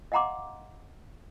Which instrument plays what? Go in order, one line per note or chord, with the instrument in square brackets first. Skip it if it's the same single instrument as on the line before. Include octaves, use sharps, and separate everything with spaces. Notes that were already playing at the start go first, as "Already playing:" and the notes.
[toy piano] D#5 F5 F#5 A#5 C6 D6